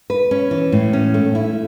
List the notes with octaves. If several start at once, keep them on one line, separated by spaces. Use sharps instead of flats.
B4
C#4
E3
A2
C#4
A3
E4